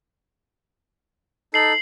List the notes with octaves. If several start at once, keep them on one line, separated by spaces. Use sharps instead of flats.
D#4 A4 C7 F#7